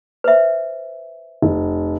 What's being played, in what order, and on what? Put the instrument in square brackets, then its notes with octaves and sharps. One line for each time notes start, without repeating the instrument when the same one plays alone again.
[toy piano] B4 C5 E5
[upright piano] F1